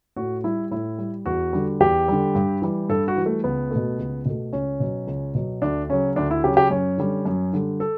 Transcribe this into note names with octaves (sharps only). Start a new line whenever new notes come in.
A2 F#4
G3 E4
A2 E4
G3
E2 F#4
D3 G3
E2 G4
D3 G3
G2
E3 G3
G2 A4
F#4
E3 G3
A3
C#2 B3
B2 A3
C#2
B2 A3
C#2 C#4
B2 F#3
C#2
B2 F#3
D2 D4
C#3 F#3 C#4
D2 D4
E4
C#3 F#3 G4
G4
F#2 C#4
D3 G3
F#2
D3 G3
A4